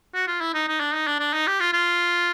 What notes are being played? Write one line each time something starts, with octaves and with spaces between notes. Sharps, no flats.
F#4
F4
E4
D#4
D#4
D4
D#4
D4
D4
D#4
G4
F4
F4